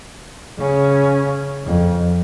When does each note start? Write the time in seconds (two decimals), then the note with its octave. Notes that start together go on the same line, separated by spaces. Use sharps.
0.59 C#3 C#4
1.64 F2